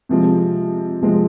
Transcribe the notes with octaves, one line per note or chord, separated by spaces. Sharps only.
C3 F3 G#3 C4
C3 F3 G#3 C4